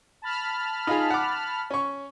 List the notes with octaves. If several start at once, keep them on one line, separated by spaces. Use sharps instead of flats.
A5 B5 F6
D#4 F4 G#4
F#5 D6
C#4 C#6